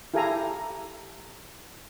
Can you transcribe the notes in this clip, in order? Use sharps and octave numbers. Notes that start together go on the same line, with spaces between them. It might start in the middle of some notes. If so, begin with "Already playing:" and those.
E4 G4 A4 F5 G#5 A#5